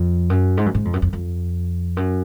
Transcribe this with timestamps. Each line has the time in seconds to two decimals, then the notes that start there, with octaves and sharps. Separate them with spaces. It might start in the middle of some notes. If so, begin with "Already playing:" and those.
Already playing: F2
0.30 F#2
0.57 G#2
0.66 F#2
0.75 G#2
0.85 F2
0.93 F#2
1.02 F2
1.13 F2
1.97 F#2